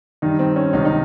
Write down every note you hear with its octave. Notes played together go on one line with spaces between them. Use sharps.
G2 D#3 D#4
C4
C#4
C#2 C3 D#3 D#4
D#4